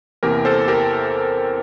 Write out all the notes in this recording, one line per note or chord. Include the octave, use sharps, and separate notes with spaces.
E2 C3 E3 A#3 G4 A#4
A4 C5
G4 A#4